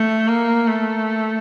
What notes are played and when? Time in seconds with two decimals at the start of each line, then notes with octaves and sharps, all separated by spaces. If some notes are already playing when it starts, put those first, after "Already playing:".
Already playing: A3
0.28 A#3
0.69 A3